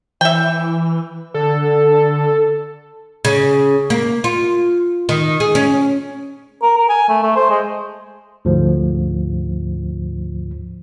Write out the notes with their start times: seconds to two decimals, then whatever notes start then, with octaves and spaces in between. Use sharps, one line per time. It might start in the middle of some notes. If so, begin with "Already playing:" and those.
0.21 E3 E5 G5
1.34 D3 A4
3.25 C#3
3.90 A#3
4.24 F4
5.09 D#3
5.40 G#4
5.55 C#4
6.62 A#4
6.77 A#4
6.89 G#5
7.09 A3
7.23 A3
7.36 C5
7.50 G#3
8.45 D2 G#2 F3